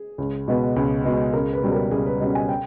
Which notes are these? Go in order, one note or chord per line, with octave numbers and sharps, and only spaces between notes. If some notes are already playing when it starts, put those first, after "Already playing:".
Already playing: G#4
C#2
B2 G#3 B3
C#2
B2 G#3 B3
C#2 A#4
B4
B2 G3 C#4
A#4
C#2 G#4
B4
B2 G3 C#4 D#5
G#5
G5